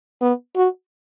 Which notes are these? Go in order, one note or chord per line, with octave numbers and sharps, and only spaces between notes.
B3
F#4